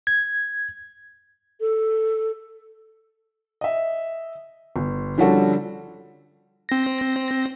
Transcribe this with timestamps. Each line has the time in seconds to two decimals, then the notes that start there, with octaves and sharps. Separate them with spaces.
0.07 G#6
1.61 A4
3.61 D#5 E5
4.76 G1
5.18 D3 F3 G3 C#4 F#4 A4
6.69 C4 A#6